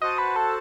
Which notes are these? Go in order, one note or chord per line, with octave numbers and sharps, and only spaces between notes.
F#4 C5 D#5 F#5 A5
B4
A4